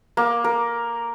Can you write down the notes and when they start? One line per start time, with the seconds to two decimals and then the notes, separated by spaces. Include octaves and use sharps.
0.17 A#3
0.44 A#4